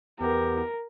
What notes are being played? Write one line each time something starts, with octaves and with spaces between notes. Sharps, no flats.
E2 B3 G4 A#4